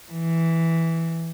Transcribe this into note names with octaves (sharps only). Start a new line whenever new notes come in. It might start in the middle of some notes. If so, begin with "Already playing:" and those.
E3